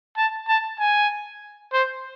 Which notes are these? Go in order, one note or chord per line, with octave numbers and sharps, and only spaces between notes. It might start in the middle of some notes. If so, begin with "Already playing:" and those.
A5
A5
G#5
C5